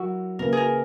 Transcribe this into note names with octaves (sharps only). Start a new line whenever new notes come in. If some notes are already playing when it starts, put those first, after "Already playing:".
Already playing: F#3 E4 F#4 A#4
C#3 E3 A#3 A#4
G#4 A#4